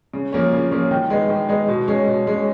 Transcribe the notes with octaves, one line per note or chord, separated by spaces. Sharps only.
C#3
F3 A#3 C#4
C#3
F3 A#3 C#4
D#3
G#3 B3 D#4
D#3
G#3 B3 D#4
B2
G#3 C#4
B2
G#3 C#4